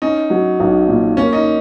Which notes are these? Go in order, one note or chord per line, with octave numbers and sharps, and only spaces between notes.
C#4 D#4
F#3
B1
A#2
A#3 C#4
D#4